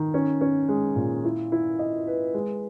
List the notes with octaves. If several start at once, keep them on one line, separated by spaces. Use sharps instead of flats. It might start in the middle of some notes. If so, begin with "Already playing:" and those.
Already playing: D#3
C#4
C#4
G#3
A#2
E4
E4
D#5
B4
G#3